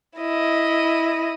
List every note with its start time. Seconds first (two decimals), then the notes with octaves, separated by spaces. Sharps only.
0.18 E4 D#5